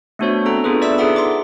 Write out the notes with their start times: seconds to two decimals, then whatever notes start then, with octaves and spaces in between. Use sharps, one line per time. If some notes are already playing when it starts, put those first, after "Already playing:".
0.19 A3 B3 D4 F#4 C5 C#5
0.45 C4 A4 A#5
0.64 B3 D4 F4 G#4 A4 B4
0.82 D5 E5 B5 E6
0.98 D#4 G#4 A4 E5 F#5 D#6
1.16 C6 D6